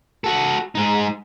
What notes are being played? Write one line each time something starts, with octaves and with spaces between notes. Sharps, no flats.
F#4 A4
G#2 D#4